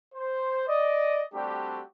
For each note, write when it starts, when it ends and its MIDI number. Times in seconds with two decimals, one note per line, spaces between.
0.15 0.65 72
0.68 1.23 74
0.68 1.23 75
1.34 1.82 55
1.34 1.82 57
1.34 1.82 60
1.34 1.82 62
1.34 1.82 66
1.34 1.82 67